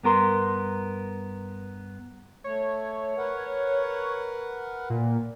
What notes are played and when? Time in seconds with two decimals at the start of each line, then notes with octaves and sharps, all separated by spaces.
0.03 G2 B3 A#4 C6
2.44 A3 C#5
3.17 A#4 B4 F#5
4.90 A#2